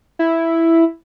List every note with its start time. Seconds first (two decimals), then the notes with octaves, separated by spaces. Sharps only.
0.19 E4